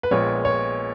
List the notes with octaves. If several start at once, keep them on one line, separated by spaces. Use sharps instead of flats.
B4
A#1 A#2 G#3 B3 C#5
C#5